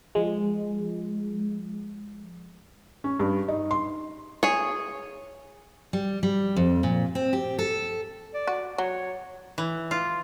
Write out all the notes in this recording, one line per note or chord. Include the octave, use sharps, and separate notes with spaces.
F3 G#3
C#4
G2
D#4
C6
G#4 C#5
G3
G3
F2
A#2
C4
G4
A4
D5
F#4
F#3 C#5
E3
F4